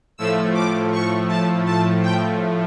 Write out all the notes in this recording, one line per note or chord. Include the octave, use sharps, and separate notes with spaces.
A2 F3 A3 E6
D6
C#6
A5
A5
G5